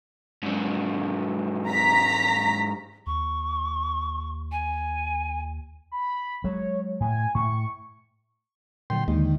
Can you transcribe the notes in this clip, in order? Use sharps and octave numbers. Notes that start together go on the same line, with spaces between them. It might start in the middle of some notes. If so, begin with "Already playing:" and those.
G#2 F#3
A#5 B6
D#2 C#6
G#5
B5
F#3 G#3 C#5
A2 G#5
A2 C#6
A#2 D3 F#3 G5 C6
D#2 D3 D#3 G#3